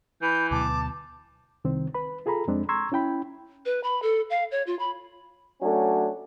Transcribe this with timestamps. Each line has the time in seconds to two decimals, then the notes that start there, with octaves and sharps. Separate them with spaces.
0.22 E3 B5 G6
0.51 D2 B2 F#3 A5 D6
1.65 C2 D#3 C4
1.94 B4 B5
2.26 F4 G#4 A4 A#5 B5
2.47 F2 G#3 C4 D4
2.69 A#5 C6 C#6 E6 G#6
2.92 C#4 E4 G5 B5
3.66 B4
3.84 B5
4.02 A4
4.30 F5
4.51 C#5
4.67 F4
4.79 B5
5.61 F#3 A3 C#4 D4